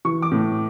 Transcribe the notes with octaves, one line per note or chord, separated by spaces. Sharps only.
E3 C#6
D6
A2